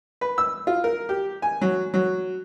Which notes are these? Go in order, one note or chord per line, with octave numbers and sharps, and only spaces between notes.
B4
E6
F4
A#4
G4
G#5
F#3
F#3